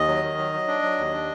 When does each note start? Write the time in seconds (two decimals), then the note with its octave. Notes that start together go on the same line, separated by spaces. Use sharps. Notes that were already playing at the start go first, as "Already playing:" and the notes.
Already playing: D#2 D#5
0.08 F#3
0.23 D#3
0.38 F#3
0.53 F#3
0.68 D4
0.82 F#3
0.98 D#2
1.13 D4